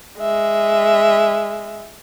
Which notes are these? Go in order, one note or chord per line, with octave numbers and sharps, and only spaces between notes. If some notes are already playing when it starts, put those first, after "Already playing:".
G#3 E5